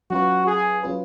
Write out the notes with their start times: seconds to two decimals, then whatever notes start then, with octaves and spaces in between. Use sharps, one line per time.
0.10 F#3 C#4 F4 F#4 B4
0.47 G#4
0.83 F#3 C#4 F4 B4